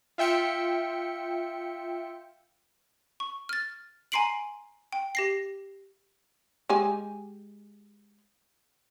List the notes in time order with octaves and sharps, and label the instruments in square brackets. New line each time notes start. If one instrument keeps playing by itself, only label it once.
[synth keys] F4 E5 G5 C#7
[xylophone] C#6
F6 A6
G#5 A#5 C6 C7 D7 F#7
G5
G4 A#6 C7
[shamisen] G#3 G4 G#5